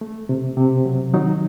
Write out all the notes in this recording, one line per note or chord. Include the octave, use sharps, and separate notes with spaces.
A3
C3
C3
F#3
D#3 F#3 D#4